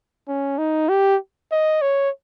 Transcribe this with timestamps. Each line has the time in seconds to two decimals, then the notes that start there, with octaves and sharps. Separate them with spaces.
0.28 C#4
0.58 D#4
0.89 G4
1.52 D#5
1.82 C#5